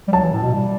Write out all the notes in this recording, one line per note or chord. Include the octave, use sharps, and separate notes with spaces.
G3
F#3 A5
E3
A2
B2
G3